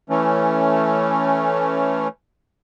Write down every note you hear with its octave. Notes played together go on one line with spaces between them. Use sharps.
E3 A3 C#4